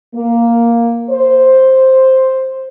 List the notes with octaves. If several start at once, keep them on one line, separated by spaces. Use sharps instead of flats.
A#3
C5